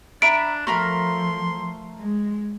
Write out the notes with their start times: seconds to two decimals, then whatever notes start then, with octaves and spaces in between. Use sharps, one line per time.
0.22 D4 E5 A#5 B5 D7
0.67 F3 A3 A#4 B5 C6
1.99 G#3